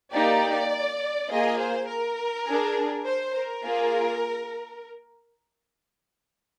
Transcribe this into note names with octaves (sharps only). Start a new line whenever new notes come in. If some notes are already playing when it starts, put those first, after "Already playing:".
A#3 D#4 G4 D5
A#3 F4 G#4 D#5
C5
A#4
D4 G#4
C5
A#4
A#3 F4 G#4